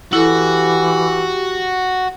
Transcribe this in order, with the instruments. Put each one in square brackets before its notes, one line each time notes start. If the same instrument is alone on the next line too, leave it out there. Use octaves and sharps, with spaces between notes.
[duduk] E3 [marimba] E4 A4 [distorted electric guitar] F#4 [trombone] G4